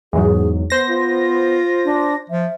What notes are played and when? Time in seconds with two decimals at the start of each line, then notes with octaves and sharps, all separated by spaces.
0.13 E2 G#2 F#3 G#4
0.70 B3 C5 A#6
0.89 F4
1.85 D4
2.30 F3 E5